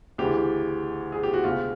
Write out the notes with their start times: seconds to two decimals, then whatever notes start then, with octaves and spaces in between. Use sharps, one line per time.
0.18 D2 C#3 E3 G4
1.12 G#4
1.23 G4
1.33 F#4
1.44 E1 D2 C#3 F4